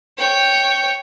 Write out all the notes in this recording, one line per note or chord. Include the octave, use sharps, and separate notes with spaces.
C#5 G5